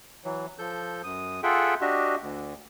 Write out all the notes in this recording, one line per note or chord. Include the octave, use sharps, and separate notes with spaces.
E3 F#3
F3 A4 G6
F#2 D#6
F4 G#4 A4 E5 F#5 G5
D4 F#4 G4 D#5 E5
D2